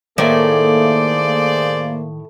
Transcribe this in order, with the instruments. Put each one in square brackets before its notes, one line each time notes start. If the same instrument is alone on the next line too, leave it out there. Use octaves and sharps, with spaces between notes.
[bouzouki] A2 [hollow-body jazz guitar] D#3 A#4 E5 [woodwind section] A#3 [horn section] G#4 C5 D5